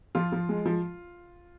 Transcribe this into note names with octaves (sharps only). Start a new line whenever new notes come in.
F3 F4
F3
G#3
F3